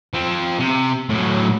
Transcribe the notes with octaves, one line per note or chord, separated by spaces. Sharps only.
F3 C4
C3
A2 F#3